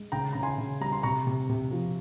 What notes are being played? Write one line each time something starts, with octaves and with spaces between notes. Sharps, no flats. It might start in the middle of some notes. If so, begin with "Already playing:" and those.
Already playing: G#3
C#3 G5 A#5
C#3 A#5
G#5 C6
C#3
G3 A#5
C6
C3 A#5 C#6
C3
C3
F3